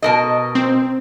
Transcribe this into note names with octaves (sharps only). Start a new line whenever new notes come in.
B2 A#4 D#5
C4